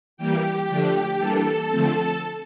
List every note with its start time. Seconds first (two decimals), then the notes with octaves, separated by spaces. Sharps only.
0.17 E3 G3 A#3 G4 G5
0.68 D3 F3 A3 D4
1.18 E3 G3 A#3 D4 A4 A5
1.69 D3 F3 A3 C4